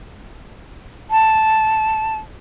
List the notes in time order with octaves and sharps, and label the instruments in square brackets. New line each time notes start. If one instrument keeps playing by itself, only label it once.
[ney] A5